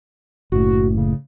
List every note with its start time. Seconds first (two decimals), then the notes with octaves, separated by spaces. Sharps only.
0.52 F#1 A2 F#4
0.97 C#3